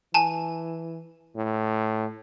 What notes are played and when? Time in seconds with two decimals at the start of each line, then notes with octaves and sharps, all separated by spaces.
0.14 E3 G#5 A5
1.37 A2